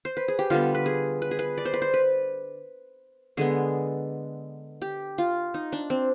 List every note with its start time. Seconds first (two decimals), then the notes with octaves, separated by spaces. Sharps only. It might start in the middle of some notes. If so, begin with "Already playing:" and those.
0.05 C5
0.17 B4
0.28 G#4
0.39 G4
0.50 D3 G3 B3 F4
0.75 B4
0.86 G#4
1.22 B4
1.31 G#4
1.39 B4
1.58 D5
1.65 C5
1.74 B4
1.82 C5
1.94 B4
3.37 D3 G#3 B3 G#4
4.82 G4
5.18 F4
5.54 D#4
5.72 D4
5.90 C4